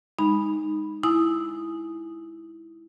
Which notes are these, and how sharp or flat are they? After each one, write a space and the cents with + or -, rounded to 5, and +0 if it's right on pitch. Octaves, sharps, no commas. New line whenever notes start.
G#3 -20 D#4 +0 B5 -5
E4 +0 G#5 +0 D#6 +0